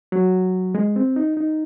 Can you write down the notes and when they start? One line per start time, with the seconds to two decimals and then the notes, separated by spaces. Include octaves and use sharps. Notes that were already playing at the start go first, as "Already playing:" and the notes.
0.12 F#3
0.75 G#3
0.96 C4
1.16 D#4
1.37 D#4